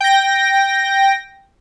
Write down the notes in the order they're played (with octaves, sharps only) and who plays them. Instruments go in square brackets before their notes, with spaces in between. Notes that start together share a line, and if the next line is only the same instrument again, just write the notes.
[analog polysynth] G5 A#6